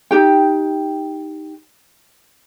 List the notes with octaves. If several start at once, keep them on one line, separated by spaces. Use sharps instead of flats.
D#4 G4 G5